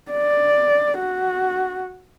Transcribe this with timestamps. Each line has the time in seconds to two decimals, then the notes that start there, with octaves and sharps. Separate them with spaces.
0.12 D5
0.99 F#4